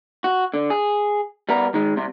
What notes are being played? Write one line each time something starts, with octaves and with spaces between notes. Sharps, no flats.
F#4
D3
G#4
G3 B3 A#4
D#3 G#3
C2 C3